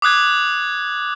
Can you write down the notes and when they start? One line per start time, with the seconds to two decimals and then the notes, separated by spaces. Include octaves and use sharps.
0.02 D6 D#6 F#6 G#6